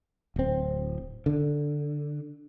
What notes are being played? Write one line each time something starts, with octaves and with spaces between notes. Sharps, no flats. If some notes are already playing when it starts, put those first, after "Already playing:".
D1 C4
D3